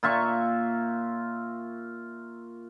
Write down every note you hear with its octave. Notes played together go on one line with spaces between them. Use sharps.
A#2 F4 E5 C#6